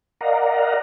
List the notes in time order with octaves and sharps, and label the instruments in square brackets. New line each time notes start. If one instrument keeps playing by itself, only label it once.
[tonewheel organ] A#4 D5 D#5 F5 F#5 A#5